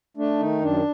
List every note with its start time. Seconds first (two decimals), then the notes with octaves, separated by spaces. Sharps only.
0.17 A3 D4
0.39 D#3 D#4
0.62 F#2 D4